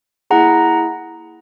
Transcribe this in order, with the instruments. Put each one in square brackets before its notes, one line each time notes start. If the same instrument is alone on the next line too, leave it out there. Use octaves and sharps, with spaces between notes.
[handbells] A#3 E4 G#4 F#5 A#5